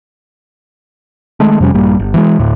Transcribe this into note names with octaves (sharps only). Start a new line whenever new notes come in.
D#3 G#3 A3
F2 C3 G3 C#4
A#1 G2 G3 A#3
G1
E3 G3 G#3
D2 A2